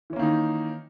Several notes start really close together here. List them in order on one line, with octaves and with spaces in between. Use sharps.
E3 C#4 A#3 D#3 D#4